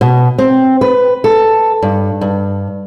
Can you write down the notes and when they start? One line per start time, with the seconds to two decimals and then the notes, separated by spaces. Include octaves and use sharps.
0.01 B2
0.38 C4
0.81 B4
1.24 A4
1.82 G2
2.21 G2